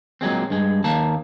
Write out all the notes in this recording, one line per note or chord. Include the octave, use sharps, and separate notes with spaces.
A#2 F#3 G#3 C4
G2 G#3
D#2 A#3 A5